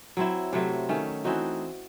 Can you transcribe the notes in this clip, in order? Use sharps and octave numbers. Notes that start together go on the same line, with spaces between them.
F#3 C4 E4
C3 F#3 A3 C4
D#3 A3 C#4
E3 C4 D#4 F#4